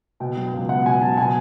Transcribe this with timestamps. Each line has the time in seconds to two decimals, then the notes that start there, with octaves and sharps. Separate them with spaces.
0.20 B2 G5
0.37 F#3
0.53 C#2
0.69 B3 F#5
0.86 B2 G#5
1.02 F#3 A5
1.17 B2 G#5